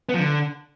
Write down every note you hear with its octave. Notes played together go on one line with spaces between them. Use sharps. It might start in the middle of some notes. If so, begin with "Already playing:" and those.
B3
F3
D3